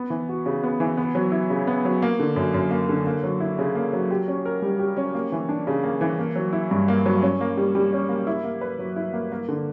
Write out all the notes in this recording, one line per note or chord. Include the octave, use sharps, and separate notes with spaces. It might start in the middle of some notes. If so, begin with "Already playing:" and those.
Already playing: B3
E3
F#4
C#3
B3
E3
B3
F#3
E4
C#3
B3
F#3
A#3
D3
F#2
F#2
A#3
D3
A#3
F#3
E4
C#3
A#3
F#3
G4
C#4
A#4
G3
G4
C#4
A#3
E3
D4
C#3
A#3
E3
A#3
F#3
E4
G2
A#3
F#3
C#4
A#3
G3
G3
C#4
A#3
E4
A#3
B4
F#3
E4
A#3
A#3
D3